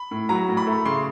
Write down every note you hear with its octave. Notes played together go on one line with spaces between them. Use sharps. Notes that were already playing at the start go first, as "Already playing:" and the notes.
Already playing: B5
A2
F#3 A#5
A2
B5
A3
C#3 C6